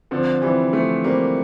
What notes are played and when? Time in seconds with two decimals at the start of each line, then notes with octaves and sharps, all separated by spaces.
0.11 D3 F3 C4
0.42 E3 G3 C4
0.73 F3 A3 C4
1.04 G3 A#3 C4